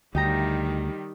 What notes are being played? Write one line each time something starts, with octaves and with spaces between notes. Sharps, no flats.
D2 D#3 G3 D#4 G4 A#5